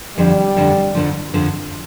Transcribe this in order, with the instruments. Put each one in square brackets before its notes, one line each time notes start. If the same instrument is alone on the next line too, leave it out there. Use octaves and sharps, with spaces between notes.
[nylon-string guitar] F2 D3 F3 [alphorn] G3
[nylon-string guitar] F2 D3 F3
F2 D3 F3
F2 D3 F3